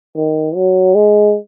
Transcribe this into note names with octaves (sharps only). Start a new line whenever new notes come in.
D#3
F#3
G#3